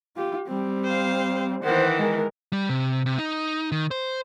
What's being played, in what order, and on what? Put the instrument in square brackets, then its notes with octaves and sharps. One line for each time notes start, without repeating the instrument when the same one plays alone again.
[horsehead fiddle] F4 G4
G3 C4
[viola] C5 F5
[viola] D#3 E3 [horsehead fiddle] C5 F#5
[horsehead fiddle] G#3 A#4
[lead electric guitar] G3
C3
C3
D#4
D#3
C5